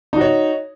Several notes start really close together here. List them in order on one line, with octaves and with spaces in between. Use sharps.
D#4 F#4 C#5